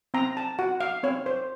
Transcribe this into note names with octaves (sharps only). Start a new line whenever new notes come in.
C4 A#5
A5
F#4 F#5
F5
C4 C#5
C5